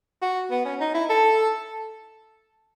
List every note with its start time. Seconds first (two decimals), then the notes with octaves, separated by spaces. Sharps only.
0.22 F#4
0.51 B3
0.65 C#4
0.80 D#4
0.94 E4
1.09 A4